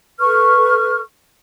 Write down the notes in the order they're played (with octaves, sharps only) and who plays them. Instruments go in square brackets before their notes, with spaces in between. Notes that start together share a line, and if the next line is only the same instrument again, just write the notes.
[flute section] A4 B4 C#6 F6